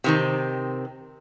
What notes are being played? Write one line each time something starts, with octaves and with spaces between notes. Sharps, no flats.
C3 D#3 C4